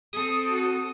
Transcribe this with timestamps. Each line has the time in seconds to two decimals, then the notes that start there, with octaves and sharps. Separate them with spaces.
0.13 C4 A4 D#6
0.46 F#4